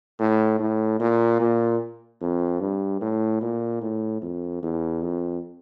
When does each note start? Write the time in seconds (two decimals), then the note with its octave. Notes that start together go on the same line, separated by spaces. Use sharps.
0.19 A2
0.59 A2
1.00 A#2
1.41 A#2
2.21 F2
2.60 G2
3.01 A2
3.41 A#2
3.82 A2
4.22 F2
4.63 E2
5.02 F2